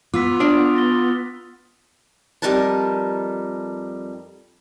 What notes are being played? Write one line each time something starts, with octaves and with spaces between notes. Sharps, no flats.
B3 F4 D6 E6 B6
D4 D5 D#6 F6
A6 A#6 G7
F2 G3 D#4 A#4 B4 A5